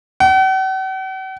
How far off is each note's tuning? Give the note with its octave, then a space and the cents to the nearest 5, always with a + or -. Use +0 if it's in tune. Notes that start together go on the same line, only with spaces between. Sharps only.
F#5 +45